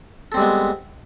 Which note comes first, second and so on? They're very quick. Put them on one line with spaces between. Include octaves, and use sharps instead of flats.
A4 C4 G3 G#3 B3